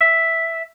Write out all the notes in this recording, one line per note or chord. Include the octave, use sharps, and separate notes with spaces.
E5